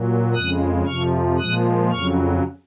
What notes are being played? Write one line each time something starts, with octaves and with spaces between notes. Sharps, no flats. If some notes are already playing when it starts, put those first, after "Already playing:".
Already playing: A#2 F#3
F2 C#3 G#3 D#6 F#6
F2 C3 F3 C#6 F6
A#2 F3 G#3 D#6 F#6
F2 C#3 F#3 C#6 F6